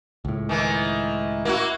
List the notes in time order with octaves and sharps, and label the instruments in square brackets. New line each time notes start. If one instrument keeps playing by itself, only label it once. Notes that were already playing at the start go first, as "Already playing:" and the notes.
[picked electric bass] C#2 A2
[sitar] D#3 E3
A#3 E4 F#4